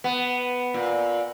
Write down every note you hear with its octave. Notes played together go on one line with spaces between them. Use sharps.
B3
A#2